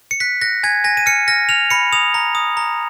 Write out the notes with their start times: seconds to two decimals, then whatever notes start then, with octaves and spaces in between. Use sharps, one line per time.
0.11 C#7
0.20 F#6 B6
0.41 F#6 A#6
0.63 G#5 G#6
0.84 G#5 A#6
0.97 D#7
1.06 F6 C#7
1.28 F6 A#6
1.49 F6 F7
1.70 B5 C#7
1.92 D#6 F7
2.14 A#5
2.35 D#6
2.57 A#5